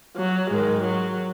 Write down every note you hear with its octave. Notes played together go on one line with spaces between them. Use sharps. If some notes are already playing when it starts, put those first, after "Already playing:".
F#3
G#2 D#3 G#3
F#3